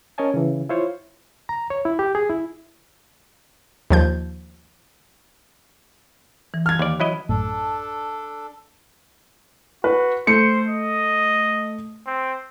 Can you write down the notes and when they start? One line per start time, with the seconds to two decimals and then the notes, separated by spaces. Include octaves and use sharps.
0.18 C#4 A#4 C#5 D#5 G#5 A5
0.34 C#3 E3
0.69 E4 F4 C5 C#5
1.49 A#5
1.70 C#5
1.85 E4
1.99 G4
2.15 G#4
2.30 E4
3.90 D#2 F3 G6
6.54 E3
6.66 F6 G#6
6.79 D#2 D5
7.00 F#3 E4 D#5
7.29 A1 F#2 A2 D4 A4
9.84 F#4 B4
10.27 A3 C5 C#7
10.68 D#5
12.07 C4